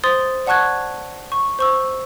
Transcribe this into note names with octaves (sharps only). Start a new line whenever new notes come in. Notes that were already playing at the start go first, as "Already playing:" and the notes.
C5 C6 D#6 A6
D5 F#5 A5 C#6 F#6 G#6
C#6
C5 C#6 E6